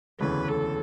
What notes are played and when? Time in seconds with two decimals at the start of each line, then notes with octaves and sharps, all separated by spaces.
0.20 E1 D2 C#3 E3 B4
0.48 A4